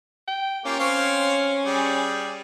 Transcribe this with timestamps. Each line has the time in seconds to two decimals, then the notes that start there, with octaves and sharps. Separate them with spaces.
0.27 G5
0.65 A#3 C#4 F4 G4
0.79 C4 C#5 F5
1.65 G3 G#4